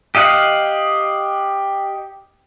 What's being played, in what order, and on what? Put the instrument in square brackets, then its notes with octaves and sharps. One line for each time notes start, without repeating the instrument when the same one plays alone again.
[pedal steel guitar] G4 D#5 F5 F#5